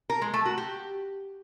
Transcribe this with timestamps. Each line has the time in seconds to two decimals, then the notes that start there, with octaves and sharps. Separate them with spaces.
0.10 A#4
0.22 G#3
0.34 A3
0.46 F#4
0.58 G4